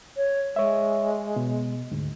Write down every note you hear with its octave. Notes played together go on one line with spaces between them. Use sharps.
C#5
G#3 C#5 E5
B2
D2 G#2